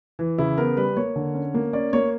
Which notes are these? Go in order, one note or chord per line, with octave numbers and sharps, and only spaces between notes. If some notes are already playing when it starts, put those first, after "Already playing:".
E3
C#3 E4
B3 A#4
G3 B4
A#3 C#5
D3
C#4
A#3
C#4 D5
A#3 C#5